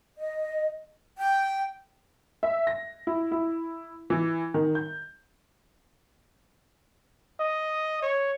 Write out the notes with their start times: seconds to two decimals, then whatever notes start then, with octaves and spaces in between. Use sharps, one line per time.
0.18 D#5
1.18 G5
2.43 E5
2.67 A#6
3.07 E4
3.32 E4
4.10 E3
4.54 D#3
4.75 G6
7.40 D#5
8.02 C#5